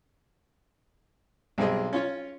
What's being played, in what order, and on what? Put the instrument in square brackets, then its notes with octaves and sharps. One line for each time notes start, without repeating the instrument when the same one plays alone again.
[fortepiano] B1 G3 C4 G#4 D#5
C#4 F4 C#5